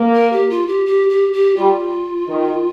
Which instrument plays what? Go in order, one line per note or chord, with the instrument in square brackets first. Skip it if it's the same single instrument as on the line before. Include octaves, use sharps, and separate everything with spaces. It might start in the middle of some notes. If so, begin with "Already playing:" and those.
Already playing: [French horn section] A#3
[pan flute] A#4
G4
F4
G4
G4
G4
G4
[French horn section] G3 [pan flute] F4
[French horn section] D#3